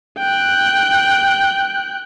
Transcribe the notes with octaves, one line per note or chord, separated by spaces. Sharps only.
G5 F#6